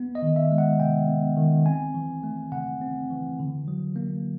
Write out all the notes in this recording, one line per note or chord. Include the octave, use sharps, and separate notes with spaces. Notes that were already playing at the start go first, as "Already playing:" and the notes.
Already playing: B3
D#5
D#3
E5
G#3
F#5
C3 G5
B3
D#3
C4 G#5
E3
A3
C#3 F#5
C4
E3
D3
F#3
A#3